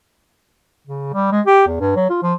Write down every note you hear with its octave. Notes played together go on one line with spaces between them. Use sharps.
C#3
G3
G#3
G4
E2
G2
F#3
F4
F3